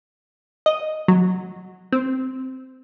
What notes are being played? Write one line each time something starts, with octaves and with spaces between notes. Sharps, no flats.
D#5
F#3
C4